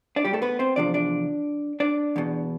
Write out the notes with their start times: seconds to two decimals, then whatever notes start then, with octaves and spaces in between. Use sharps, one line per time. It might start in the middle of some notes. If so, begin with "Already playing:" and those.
0.16 D4 D5
0.25 G3 G4
0.33 A3 A4
0.42 B3 B4
0.59 C4 C5
0.76 E2 C3 F3 D4 D5
0.94 D4 D5
1.80 D4 D5
2.16 E2 B2